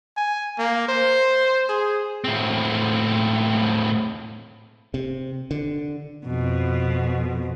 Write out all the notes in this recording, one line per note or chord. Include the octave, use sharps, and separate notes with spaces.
G#5
A#3
C5
G#4
A2 C4
C3
D3
F2 B2